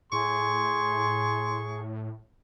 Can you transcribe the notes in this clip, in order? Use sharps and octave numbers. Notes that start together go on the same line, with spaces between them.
A2 G#4 C6 C#6